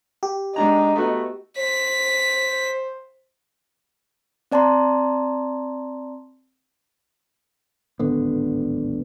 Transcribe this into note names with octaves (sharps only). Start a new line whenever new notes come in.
G4
G#2 D4 D#4 A#5
A3 B3 F#4
C5 B6
C4 D5 A5 A#5 C6
D1 G#1 D3 B3